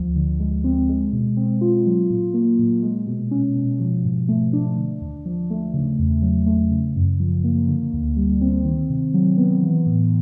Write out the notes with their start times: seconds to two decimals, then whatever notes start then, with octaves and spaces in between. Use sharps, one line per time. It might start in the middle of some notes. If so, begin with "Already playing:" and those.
Already playing: D2 F3
0.16 D3
0.40 G#3
0.64 C4
0.89 G#3
1.13 B2
1.37 C4
1.61 F4
1.86 F#3
2.10 A#2
2.34 A#3
2.59 A#2
2.83 G#3
3.07 B2
3.31 C#4
3.56 B2
3.80 F3
4.04 G#2
4.28 A3
4.53 D4
4.77 D3
5.01 D#2
5.26 F3
5.50 A3
5.74 C#3
5.99 E2
6.22 F#3
6.46 A3
6.71 C#3
6.96 F#2
7.20 F3
7.44 A#3
7.68 D3
7.93 D2
8.16 G3
8.41 C4
8.65 D#3
8.89 C3
9.14 F#3
9.37 B3
9.63 E3
9.86 A2